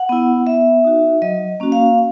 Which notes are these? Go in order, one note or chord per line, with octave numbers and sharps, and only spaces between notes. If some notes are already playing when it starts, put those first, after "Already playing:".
Already playing: F#5
B3 E4
B3 E5
D#4 F#4
F#3 D#5
A#3 C#4 F#4
F5